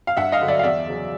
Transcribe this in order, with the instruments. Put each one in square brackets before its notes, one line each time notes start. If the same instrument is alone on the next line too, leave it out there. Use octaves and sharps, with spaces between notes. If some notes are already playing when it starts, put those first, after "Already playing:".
[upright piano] F5
G2 E5 F#5
D#5 F5
D3 F#3
D5 E5
F5
E2 D5 E5
C#3 F#3